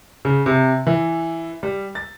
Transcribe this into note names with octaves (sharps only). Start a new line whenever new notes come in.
C#3
C3
E3
G3
A6